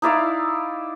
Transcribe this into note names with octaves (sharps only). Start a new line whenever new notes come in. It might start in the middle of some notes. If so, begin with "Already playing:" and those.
D#4 E4 D5 F5